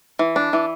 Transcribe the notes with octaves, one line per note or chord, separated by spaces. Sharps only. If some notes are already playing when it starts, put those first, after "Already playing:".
E3
D4
E3